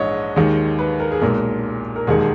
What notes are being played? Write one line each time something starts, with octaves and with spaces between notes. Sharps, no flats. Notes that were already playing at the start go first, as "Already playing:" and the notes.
Already playing: A#1 G#2 E3 G#3 C#5 D#5
D#2 D#3 G#3
B4
A#4
G#4
B1 A#2 G#3 A#4
A#4
E1 D#2 D#3 G#3 G#4